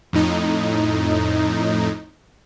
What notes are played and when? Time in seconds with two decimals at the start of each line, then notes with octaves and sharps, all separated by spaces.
0.13 F2 A2 D#4